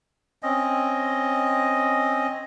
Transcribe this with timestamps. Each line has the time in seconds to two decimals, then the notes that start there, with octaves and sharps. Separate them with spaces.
0.43 C4 C#4 D#5